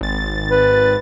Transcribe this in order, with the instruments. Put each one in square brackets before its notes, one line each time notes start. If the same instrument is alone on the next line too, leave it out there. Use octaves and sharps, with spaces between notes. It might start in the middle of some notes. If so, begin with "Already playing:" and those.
[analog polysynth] G#1 A6
[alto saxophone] B4